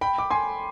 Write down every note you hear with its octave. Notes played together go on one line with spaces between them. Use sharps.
G5 B5
D6
G#5 C6